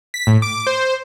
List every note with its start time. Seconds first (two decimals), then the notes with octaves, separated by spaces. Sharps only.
0.14 B6
0.27 A2
0.42 D6
0.67 C5